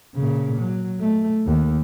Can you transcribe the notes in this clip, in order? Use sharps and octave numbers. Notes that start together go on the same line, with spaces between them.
A#2 C#3
F#3
A3
D#2